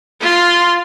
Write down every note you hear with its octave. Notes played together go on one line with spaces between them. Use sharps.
F4 C6